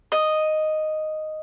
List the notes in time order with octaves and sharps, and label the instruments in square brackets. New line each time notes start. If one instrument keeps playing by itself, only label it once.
[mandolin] D#5